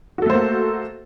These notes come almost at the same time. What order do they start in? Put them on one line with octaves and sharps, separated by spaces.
F#4 A4 A3 C5 A#3